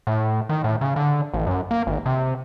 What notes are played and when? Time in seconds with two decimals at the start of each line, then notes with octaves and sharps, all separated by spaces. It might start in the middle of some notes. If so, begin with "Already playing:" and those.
0.07 A2
0.49 D#3
0.64 A2
0.81 C#3
0.96 D3
1.33 A1
1.46 F#2
1.71 A#3
1.87 G#1
2.06 C3